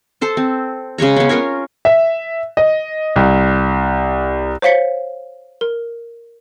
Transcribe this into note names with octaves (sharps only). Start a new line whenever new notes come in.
A4 C5 A5
C4
C#3 G#3 C#5 A#5
B3 C#4
C#4 F4 A#4 C#5
E5
D#5
C2
C5 C#5 F5 B6 C#7
A#4